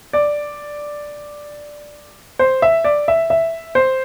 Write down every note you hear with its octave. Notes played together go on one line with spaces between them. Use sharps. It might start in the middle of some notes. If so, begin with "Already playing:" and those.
D5
C5
E5
D5
E5
E5
C5